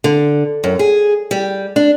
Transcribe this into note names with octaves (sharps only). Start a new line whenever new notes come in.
D3
F#2
G#4
G3
D4